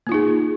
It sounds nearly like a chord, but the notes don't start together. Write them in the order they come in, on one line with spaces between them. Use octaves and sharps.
A#3 F4 D#4 G#4